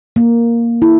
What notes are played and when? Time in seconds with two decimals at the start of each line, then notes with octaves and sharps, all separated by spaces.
0.16 A#3
0.82 E4